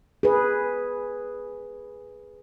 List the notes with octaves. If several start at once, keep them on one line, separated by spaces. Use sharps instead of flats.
G#4 B4